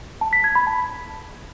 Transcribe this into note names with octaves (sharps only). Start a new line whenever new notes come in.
A5
B6
G#6
B5
A5